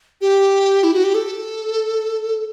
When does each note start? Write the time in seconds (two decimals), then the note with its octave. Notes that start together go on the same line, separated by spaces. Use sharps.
0.21 G4
0.84 E4
0.94 F#4
1.04 G4
1.15 A4